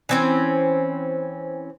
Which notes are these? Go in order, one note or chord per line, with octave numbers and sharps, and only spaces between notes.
E3 C4 C#4